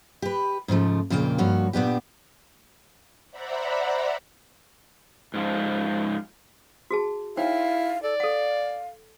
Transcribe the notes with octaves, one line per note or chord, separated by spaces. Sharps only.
G4 B4
G#2 C#3 F3 A3
F2 A#2 C#3 A#3 G5
G2 F3 A#3 F#4 C#5
A#2 B3 D4 G4
C5 D5 E5 F#5 A#5 B5
G#2 F3
F#4 G#4 A5
D#4 E4 C#5 F5 G5
A4 D5
A4 F5 F#5